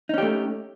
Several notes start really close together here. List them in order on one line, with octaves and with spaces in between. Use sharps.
D#4 C#4 G4 A3